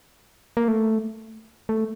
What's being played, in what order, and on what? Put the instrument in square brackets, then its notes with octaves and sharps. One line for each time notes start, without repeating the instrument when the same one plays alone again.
[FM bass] A#3
A3
A3